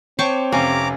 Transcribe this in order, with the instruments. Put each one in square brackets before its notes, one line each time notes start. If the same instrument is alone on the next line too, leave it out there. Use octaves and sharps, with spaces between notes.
[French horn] C4 [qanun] C5 C#6 D6 [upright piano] C#5 G5 A5
[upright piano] F1 C3 F5 [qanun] C#4 [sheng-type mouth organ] A#5 D6